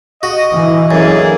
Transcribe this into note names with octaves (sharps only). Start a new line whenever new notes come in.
F#4 D#5
E3
F#2 D3 A#3 G#4